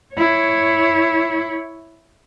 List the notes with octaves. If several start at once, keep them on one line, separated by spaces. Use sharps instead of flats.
E4 C#5